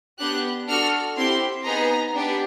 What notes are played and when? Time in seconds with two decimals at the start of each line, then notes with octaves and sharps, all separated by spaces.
0.19 B3 D4 G4 F#6
0.68 D4 F#4 A4 F6
1.17 C4 E4 G4 C6
1.66 B3 D#4 G#4 A#5
2.14 B3 D4 G4